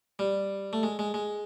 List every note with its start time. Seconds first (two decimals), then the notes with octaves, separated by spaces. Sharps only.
0.19 G3
0.73 A3
0.83 G#3
0.99 G#3
1.14 G#3